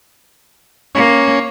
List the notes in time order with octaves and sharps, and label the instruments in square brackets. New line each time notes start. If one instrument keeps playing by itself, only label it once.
[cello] A#3 [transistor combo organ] C#4 C#5